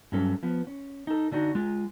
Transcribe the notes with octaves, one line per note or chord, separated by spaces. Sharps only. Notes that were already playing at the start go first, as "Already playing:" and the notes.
G2 F#3 C#4 A4
F3 B3
C#4
D#4 A4
D3 D4 D#4 F#4
G#3 F4